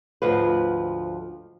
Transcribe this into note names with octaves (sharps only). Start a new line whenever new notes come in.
D2 G#2 F3 B4